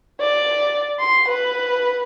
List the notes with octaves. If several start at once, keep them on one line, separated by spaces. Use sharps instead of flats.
D5
C6
B4